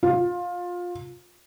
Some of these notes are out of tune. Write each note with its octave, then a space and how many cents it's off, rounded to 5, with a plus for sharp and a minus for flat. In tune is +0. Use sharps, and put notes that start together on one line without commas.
F4 +20